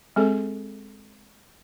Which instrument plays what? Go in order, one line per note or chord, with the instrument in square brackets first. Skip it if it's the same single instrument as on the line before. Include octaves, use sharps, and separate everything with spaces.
[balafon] G#3 C4 G#4 A4